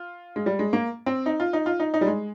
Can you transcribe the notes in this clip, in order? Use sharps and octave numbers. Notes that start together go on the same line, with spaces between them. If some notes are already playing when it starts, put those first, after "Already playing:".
Already playing: F4
G#3
G3
G#3
A#3
C4
D#4
F4
D#4
F4
D#4
D#4
G3
G#3